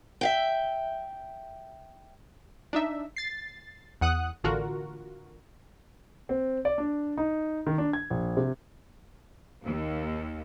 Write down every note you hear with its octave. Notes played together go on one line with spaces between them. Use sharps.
E5 F5 G5
D4 D#4 E5
A6 C7
E2 F#5 D#6 F#6
A1 D3 F4 F#4 A#4
C4
D5
D4
D#4
D#3
D4
G#6
A#1
C3
D#2